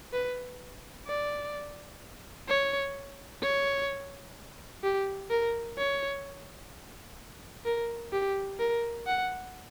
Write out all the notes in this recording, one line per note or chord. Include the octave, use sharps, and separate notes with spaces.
B4
D5
C#5
C#5
G4
A#4
C#5
A#4
G4
A#4
F#5